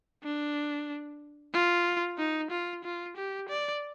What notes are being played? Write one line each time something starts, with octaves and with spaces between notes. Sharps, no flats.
D4
F4
D#4
F4
F4
G4
D5